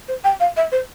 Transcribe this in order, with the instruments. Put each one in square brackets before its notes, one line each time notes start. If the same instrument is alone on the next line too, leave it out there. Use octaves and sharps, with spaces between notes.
[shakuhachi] C5
G5
F5
E5
C5